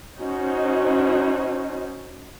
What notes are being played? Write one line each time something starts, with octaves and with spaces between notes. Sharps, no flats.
C#4 D#4 F#4 C5